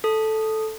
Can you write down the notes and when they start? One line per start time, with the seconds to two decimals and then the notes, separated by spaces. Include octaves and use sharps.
0.04 A4